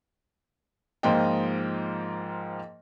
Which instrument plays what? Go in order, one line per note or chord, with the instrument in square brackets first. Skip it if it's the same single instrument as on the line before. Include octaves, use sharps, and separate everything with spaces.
[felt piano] G#2 F3 A#3 F4 D#5 G5